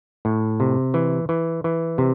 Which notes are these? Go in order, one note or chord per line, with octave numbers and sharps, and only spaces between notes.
A2
C3
E3
E3
E3
C3